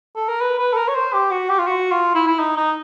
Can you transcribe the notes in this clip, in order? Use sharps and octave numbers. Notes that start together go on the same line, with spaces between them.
A4
A#4
B4
B4
A4
A#4
C#5
C5
G4
F#4
G4
F4
F#4
F4
E4
E4
D#4
D#4